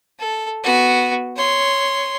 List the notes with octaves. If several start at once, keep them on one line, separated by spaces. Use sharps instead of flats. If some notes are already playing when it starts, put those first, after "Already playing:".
A4
B3 F#4
C#5 C6